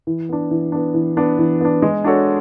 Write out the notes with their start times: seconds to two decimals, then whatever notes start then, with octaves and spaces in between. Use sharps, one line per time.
0.07 E3
0.29 B3 D4
0.51 E3
0.72 B3 D4
0.94 E3
1.17 B3 D4
1.39 E3
1.61 B3 D4
1.82 G#3
2.04 D4 F#4 A4 C#5